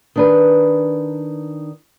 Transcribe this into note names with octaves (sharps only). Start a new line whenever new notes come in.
D#3 D4 B4